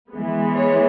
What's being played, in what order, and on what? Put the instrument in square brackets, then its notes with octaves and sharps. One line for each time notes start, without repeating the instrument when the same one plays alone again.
[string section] E3 G#3 B3
C#5